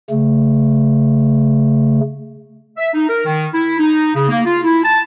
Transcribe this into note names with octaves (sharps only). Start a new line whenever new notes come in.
C#3 A3
E5
D#4
A#4
D#3
E4
D#4
C#3
A#3
F4
E4
A5